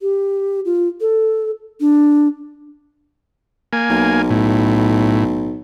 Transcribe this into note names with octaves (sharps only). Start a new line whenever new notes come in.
G4
F4
A4
D4
A#3 G#5
B1
A2